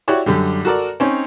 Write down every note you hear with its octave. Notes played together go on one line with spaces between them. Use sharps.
E4 F#4 G4 C#5 D5
F#2 D3 G3
F#4 A4 A#4 D5
C4 C#4 D#4 C#5